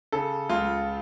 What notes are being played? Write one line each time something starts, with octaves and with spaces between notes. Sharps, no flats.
C#3 A4
C#2 F4